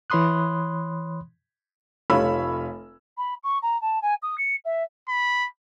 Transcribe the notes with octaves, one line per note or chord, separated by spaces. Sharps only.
E3 C#5 B5 C6 D#6 F#6
F1 A3 F4 C#5 B5 E6
B5
C#6
A#5
A5
G#5
D#6
C#7
E5
B5